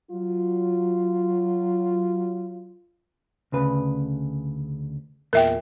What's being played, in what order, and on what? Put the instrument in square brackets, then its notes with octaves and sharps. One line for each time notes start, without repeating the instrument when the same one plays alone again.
[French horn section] F#3 F4
[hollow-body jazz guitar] D2 C#3 B4
[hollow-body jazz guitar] E2 A#2 [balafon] A#4 E5 G5